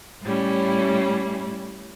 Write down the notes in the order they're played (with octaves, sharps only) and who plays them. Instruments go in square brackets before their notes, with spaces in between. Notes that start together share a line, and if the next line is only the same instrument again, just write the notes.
[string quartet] A2 G3 C#4 E4